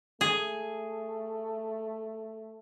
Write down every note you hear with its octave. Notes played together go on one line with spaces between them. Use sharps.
A3 G#4